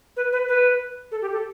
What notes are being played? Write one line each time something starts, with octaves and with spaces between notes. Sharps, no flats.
B4
B4
B4
A4
G4
A4